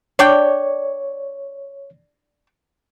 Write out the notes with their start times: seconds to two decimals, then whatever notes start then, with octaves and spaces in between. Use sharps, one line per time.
0.19 D4 C#5 D5 G5